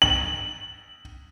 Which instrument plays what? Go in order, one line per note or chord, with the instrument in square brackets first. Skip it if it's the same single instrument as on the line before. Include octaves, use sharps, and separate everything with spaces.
[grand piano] F#7